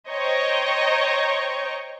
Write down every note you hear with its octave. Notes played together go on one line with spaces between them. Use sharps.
C5 C#5 D#5 G5 A#5 C#6